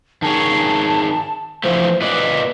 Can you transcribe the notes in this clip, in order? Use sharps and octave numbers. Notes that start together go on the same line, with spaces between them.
D#3 G#4 C#5 A5
E3 F3 A3 C5
A#2 B4 D5 D#5